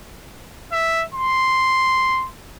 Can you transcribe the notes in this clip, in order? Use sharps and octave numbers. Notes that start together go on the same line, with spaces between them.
E5
C6